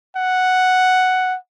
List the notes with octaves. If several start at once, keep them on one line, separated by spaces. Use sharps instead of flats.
F#5